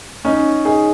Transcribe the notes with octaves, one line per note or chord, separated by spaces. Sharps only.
C#4 D#4
D#4 G#4